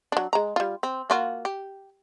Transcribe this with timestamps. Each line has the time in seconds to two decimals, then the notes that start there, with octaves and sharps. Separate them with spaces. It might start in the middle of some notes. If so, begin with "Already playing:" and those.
0.12 F#3 D4
0.33 G#3 A#5
0.56 G3 F4
0.83 C4
1.10 A#3 F4 F#4
1.45 G4